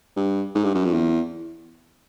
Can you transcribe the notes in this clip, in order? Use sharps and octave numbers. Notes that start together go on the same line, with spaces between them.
G2
G#2
G2
F#2
F2
E2